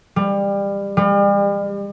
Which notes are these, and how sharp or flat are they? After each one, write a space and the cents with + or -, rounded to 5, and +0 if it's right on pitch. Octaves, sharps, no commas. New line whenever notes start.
G3 +25
G3 +40